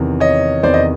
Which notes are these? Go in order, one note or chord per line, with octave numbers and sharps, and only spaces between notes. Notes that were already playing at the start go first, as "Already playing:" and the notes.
Already playing: E2 C3 D#3
C#5 D#5
E2 C3 D#3 C5 D5
D#5